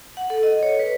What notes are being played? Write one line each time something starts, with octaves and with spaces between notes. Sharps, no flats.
F#5
A4
D#5
C#5
B4